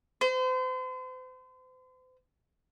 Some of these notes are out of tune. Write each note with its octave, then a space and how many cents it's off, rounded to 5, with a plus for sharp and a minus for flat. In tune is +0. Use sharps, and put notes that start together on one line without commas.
C5 -40